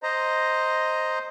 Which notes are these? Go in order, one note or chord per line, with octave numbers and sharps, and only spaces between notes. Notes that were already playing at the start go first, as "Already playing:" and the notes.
C5 D#5 A#5